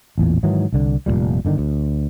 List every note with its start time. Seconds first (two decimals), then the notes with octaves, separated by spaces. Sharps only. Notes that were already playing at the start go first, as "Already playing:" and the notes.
0.18 A1 E2 A#2
0.43 G#2 D#3 E3 F#3
0.73 C2 D3
1.06 F1 D#2 A#2 G3
1.45 G1 D3 D#3
1.58 D2